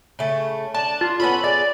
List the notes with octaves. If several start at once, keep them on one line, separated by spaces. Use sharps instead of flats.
C#3 A3
D4 A5
F4
B3 C#4 A4 B5
G#4 D5